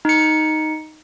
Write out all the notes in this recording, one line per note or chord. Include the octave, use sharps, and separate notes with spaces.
D#4 C#7